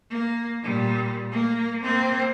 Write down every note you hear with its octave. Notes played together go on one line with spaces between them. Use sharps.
A#3
A#2 G3
A#3
A#3 C4